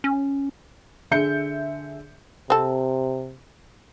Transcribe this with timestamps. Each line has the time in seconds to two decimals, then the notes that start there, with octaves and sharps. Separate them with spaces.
0.04 C#4
1.11 D3 G#4 E5 G6 C#7
2.50 C3 C4 A4